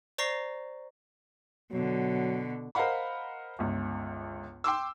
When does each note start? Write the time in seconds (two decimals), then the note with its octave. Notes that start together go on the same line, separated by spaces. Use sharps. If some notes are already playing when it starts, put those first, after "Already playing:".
0.18 C5 D5 A#5 C#6 A#6 C7
1.71 B2 D3 F#3
2.75 A#4 C5 D#5 F5 F#5 B5
3.59 G1 C#2
4.64 G5 C6 D6 E6